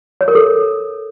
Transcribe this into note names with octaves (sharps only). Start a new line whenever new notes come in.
C#5
A#4
A4